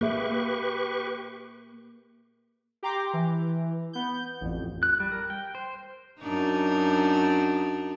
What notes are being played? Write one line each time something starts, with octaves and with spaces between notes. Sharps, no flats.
A#3 G4 G#4 B4 E5 C#6
G4 G5 A#5 C6 D6
E3
B3 G6
A1 F2
F#6
G3
A#4
G5
C5
F#2 D4 D#4